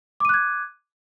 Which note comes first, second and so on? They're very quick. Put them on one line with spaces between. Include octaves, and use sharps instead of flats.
D6 D#7 F#6 G#6